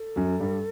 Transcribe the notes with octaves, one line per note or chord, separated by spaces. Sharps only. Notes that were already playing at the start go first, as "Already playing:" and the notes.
Already playing: A4
F#2 F#3
G2 G3